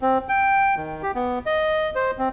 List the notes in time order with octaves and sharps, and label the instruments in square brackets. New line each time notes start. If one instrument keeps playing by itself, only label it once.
[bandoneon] C4
G5
D#3
G4
B3
D#5
C5
C4